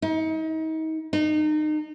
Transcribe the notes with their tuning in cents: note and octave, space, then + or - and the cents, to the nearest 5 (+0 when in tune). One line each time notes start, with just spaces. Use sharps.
D#4 +35
D#4 -30